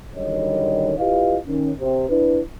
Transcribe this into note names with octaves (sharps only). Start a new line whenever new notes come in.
F#2 D3 D#3 G3 C#5 D#5
E4 F4 G4 B4 D#5 F5
D#3 C#4
C3
D4 E4 B4